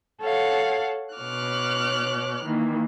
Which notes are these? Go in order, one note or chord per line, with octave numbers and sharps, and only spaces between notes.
A4 C#5 F5 F#5
B2 C#5 D6 F6 F#6
D#3 E3 A#3